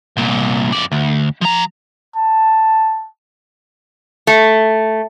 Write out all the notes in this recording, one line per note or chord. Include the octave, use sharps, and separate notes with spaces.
C2 A#2
F2 D5
D2
F3 A#5
A5
A3